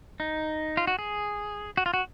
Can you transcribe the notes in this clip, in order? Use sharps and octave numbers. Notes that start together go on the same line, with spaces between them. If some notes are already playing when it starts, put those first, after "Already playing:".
D#4
F4
F#4
G#4
F#4
F4
F#4